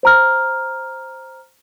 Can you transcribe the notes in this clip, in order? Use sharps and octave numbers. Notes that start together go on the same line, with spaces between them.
C5 A#5 F6